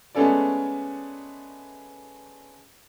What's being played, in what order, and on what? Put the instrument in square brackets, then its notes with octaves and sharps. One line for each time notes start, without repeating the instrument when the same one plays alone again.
[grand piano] G#3 A3 B3 C#4 A4 D5